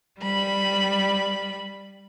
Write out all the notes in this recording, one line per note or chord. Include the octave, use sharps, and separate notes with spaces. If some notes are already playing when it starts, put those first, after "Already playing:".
G3 B5